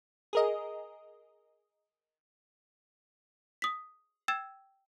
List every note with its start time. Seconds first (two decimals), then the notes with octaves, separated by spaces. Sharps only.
0.33 G#4 A#4 D#5
3.62 D#6 B6
4.28 G5 E6 G#6 A6 E7